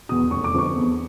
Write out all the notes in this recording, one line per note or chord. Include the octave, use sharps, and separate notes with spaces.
E2 B2 D#6
F1 C#6
D6
F2 D3 F3 C#6
E2